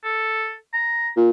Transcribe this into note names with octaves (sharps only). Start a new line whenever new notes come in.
A4
A#5
A#2